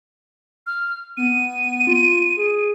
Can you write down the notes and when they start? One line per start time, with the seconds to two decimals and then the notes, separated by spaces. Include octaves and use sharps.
0.67 F6
1.17 B3 D#7
1.87 F4
2.37 G#4